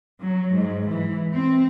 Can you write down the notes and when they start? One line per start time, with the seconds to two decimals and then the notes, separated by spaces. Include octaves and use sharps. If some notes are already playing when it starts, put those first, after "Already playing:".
0.23 F#3
0.56 G#2
0.91 E3
1.33 C4